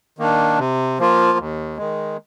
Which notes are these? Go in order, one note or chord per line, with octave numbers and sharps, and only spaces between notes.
D#3 A#3 D4
C3
F3 A#3 F4
D#2
D#3 G#3